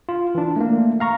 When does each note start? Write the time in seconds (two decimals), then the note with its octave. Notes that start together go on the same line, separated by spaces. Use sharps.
0.09 F4
0.35 E3 D4
0.56 A3 A#3
1.00 F5 A#5 C#6